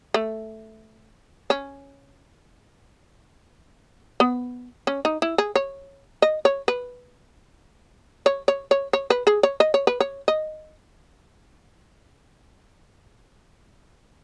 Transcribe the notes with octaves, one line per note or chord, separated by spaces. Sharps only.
A3
C#4
B3
C#4
D#4
E4
G#4
C#5
D#5
C#5
B4
C#5
C#5
C#5
C#5
B4
G#4
C#5
D#5
C#5
B4
C#5
D#5